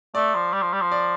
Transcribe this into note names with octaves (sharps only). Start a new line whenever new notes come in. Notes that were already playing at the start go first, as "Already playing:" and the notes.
A3 D5
F3
G3
F3
G3
F3
D5